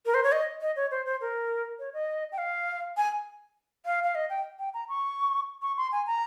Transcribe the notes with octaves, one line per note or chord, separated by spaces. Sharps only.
A#4
C5
C#5
D#5
D#5
C#5
C5
C5
A#4
C#5
D#5
G5
F5
G#5
F5
F5
D#5
G5
G5
A#5
C#6
C#6
C6
G#5
A#5